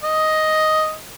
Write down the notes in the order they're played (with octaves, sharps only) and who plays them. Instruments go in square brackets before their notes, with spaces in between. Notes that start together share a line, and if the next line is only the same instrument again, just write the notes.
[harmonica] D#5